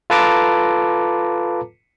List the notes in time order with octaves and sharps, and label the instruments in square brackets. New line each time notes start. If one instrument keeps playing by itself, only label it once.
[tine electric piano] F4 A4 B4 A5 A#5 D6